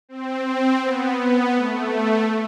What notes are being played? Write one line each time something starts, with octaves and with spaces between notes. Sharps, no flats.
C4
C4
B3
B3
A3